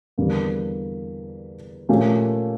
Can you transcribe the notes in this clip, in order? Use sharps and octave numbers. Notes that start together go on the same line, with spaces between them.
E2 D3 G3 A#3
A#2 F3 A3 C#4 G4